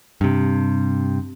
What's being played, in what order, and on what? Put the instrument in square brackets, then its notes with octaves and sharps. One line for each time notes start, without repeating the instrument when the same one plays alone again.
[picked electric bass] G2 C3